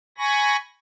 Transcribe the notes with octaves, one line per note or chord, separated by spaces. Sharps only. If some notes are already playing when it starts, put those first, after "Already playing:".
G#5 B5 C#6 A#6